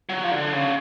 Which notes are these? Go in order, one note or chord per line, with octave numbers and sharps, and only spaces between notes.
F#3
F3
D3
C#3